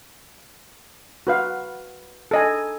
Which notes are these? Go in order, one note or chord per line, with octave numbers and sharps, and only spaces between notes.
F#4 B4 F5
A4 D#5 G#5